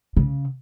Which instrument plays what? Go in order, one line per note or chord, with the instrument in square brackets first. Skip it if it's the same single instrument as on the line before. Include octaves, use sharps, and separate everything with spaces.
[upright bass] C#3